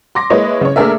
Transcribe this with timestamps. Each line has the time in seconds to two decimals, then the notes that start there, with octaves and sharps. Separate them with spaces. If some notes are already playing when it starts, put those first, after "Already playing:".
0.15 C6 D6 A#6
0.30 G#3 A#3 E4 B4 C#5 D#5
0.61 C#3 C#5
0.76 A3 A#3 D4 G#4 A#4 E5